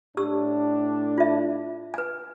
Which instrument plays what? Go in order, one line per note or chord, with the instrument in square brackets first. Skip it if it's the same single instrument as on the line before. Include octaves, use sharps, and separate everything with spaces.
[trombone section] A2 D4 [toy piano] G4 E6
[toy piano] F4 E5
B4 G#5